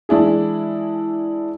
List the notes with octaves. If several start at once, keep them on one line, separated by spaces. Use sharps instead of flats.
E3 G#3 D4 E4 G#4